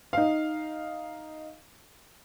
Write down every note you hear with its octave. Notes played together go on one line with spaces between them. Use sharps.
D#4 F5